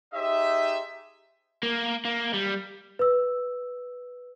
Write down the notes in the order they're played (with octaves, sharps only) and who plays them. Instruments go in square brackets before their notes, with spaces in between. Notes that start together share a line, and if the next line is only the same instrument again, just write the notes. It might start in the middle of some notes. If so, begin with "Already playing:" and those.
[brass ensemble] D#4 G4 G#4 C5 D#5 E5
[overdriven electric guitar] A#3
A#3
G3
[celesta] B4 E6